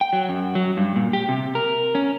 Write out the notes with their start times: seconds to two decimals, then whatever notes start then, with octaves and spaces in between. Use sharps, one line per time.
0.01 G5
0.13 F#3
0.29 F#2
0.55 F#3
0.77 G2
0.96 A#2
1.13 G4
1.29 C3
1.55 A#4
1.95 C#4